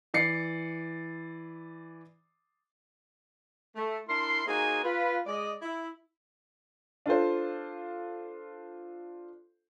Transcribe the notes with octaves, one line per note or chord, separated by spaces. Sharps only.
E3 D5 C7 C#7
A3
D4 E4 A#4 C6
A#3 D#4 F#4 G#4 C5 G#5
F4 B4
G#3 D5 D#5
E4
D4 F4 A4 C5